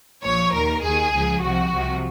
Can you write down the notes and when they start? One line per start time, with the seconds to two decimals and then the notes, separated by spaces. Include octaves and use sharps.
0.24 A#1 A#2 F3 C#5
0.54 D#2 D#3 A#4
0.83 D#2 D#3 G#4
1.13 C#2 C#3 F3
1.42 C2 C3 F3 F#4
1.71 C2 C3 F3